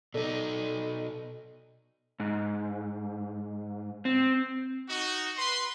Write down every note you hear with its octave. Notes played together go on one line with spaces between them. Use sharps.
B2 D#4 A4 D5
G#2
C4
D#4 F#4
B4 C6